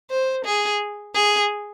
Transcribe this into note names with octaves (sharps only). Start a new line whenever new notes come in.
C5
G#4
G#4